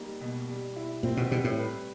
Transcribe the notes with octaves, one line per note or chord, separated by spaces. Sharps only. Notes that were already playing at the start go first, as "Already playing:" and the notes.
Already playing: G3 A#3 D#4
B2
G3
E4
A#2 C4
B2
B2 G3
A2
B4